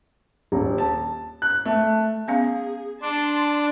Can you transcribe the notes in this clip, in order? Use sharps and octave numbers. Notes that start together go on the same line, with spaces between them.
D#1
A5
F#6
A3
B3 C#4 G#4 F5
D4 A5 C6